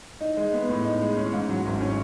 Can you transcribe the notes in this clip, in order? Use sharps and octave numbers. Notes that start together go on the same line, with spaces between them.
D#4
G#3
B3
A2
D#4
G#3
C#4
G#2
F#3
G#1
C#4